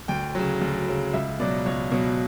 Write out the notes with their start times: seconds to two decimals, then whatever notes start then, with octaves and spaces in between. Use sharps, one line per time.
0.08 D2 G5
0.35 C#3 F#3
0.61 D2
0.88 C#3 F#3
1.14 C#2 E5
1.40 B2 F#3 D5
1.66 C#2 C#5
1.92 B2 F#3